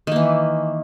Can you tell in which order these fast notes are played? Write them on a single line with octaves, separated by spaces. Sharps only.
D#3 A#3 E3